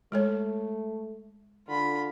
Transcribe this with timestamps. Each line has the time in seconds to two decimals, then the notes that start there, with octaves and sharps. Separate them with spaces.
0.12 G#3 A3 A4 C#5
1.68 D3 F4 B5